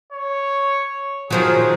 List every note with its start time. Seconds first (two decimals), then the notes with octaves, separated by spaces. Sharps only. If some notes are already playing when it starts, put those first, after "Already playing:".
0.12 C#5
1.30 D#3 F3 F#3 G#4